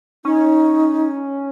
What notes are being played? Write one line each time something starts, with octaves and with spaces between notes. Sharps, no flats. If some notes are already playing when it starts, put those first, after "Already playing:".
C#4 D#4